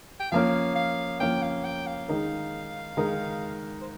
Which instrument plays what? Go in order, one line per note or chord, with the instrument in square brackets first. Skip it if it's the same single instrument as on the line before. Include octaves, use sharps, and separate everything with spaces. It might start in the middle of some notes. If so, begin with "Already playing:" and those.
[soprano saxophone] G5
[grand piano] F3 A#3 C#4 [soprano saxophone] F5
[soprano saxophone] F5
[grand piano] F3 A#3 C#4 [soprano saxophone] G5
[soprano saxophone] F5
G5
F5
[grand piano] D#3 G#3 D#4 A#4
D#3 G#3 D#4 A#4
[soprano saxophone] C5